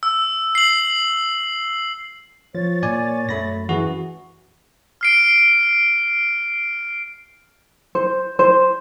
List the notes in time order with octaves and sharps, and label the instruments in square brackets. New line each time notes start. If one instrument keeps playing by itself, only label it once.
[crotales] E6
C7 F#7
[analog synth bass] F3 [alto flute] C#5 [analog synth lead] A6
[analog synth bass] A#2 [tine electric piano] D5 G#5
[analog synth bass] F#2 [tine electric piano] A3 B5 A#6
[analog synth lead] E3 [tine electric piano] F#4 G#4
[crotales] F6 C7 D7
[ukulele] C5
C5